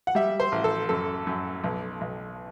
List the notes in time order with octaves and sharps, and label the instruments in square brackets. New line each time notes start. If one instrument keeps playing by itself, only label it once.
[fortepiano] F#5
G3 E5
C5
A1
A4
F#2 A4
F#2
B1
B1